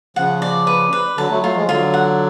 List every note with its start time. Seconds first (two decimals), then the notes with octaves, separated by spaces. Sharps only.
0.16 C#3 F3 F#5
0.42 D5
0.67 B4
0.93 B4
1.18 D3 F#3 A5
1.31 F#3 A3
1.43 F#3 A3 F4
1.56 F3 G#3
1.68 D3 F#3 F4
1.94 F#5